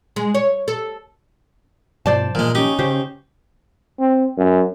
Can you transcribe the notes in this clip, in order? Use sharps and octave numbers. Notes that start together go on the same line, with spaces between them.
G#3
C#5
A4
G2 B2 F3 C5 D5 A5
A#2 E3 F3 G#3 A#3
C#4 D#4 G4
C#3 G4 C5
C4
F#2